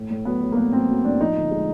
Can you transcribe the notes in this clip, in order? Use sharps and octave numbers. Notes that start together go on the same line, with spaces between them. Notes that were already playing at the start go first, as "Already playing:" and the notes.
Already playing: A2
A2
F#3 B3
F#3
A#3
A2 B3
F#3 C4
F#3
A2 D4
F3 D#4
D3
G#3